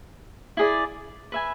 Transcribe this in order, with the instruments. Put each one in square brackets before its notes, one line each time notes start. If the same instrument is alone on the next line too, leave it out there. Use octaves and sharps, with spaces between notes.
[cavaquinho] E4 G#4 D5
B4 E5 G#5